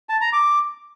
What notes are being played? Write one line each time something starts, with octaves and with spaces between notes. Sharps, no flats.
A5
A#5
D6